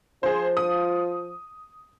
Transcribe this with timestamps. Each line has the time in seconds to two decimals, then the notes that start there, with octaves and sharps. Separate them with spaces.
0.23 F3 G#4 C5
0.57 D#6